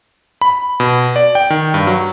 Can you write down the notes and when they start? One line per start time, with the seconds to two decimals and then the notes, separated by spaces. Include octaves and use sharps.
0.42 B5
0.80 B2
1.16 D5
1.35 G5
1.50 D#3
1.74 G2
1.87 F#3